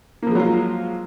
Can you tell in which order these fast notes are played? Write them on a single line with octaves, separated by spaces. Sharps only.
A#3 F3 G#3 F#3 F4